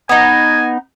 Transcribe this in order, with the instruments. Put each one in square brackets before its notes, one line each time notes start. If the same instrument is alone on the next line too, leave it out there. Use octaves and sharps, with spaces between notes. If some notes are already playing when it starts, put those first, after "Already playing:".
[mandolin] B3 D#4 [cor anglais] G#5